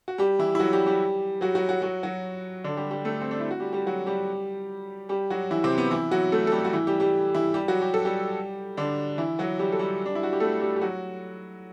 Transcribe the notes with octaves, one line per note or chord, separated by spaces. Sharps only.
F#4
G3 G4
E3 E4
E4
F#3 F#4
G3 G4
G3 G4
F#3 F#4
F#3 F#4
F#3 F#4
F#3 F#4
F#3 F#4
D3 D4
G3 G4
G3 G4
A3 A4
C4
D4
E4
F#4
G3 G4
G3 G4
F#3 F#4
G3 G4
G3 G4
F#3 F#4
E3 E4
C3 C4
B3
E3 E4
F#3 F#4
A3 A4
A4
G3 G4
F#4
E3 E4
G3 G4
G3 G4
E3 E4
G3 G4
F#3 F#4
G4
A4
G3 G4
D3 D4
E3 E4
F#3 F#4
G3 G4
A4
G3 G4
D4
E4
F#4
G4
A3 A4
G3 G4
G4
F#3 F#4